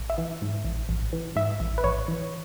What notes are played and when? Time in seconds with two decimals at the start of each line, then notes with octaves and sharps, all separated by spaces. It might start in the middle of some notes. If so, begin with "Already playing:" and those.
Already playing: A1
0.10 E5
0.18 E3
0.42 G#2
0.65 A1
0.89 A1
1.13 E3
1.36 G#2 E5
1.60 A1
1.78 B4
1.84 A1 C#5
2.08 E3